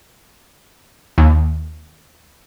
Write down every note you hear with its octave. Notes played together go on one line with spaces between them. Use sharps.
D#2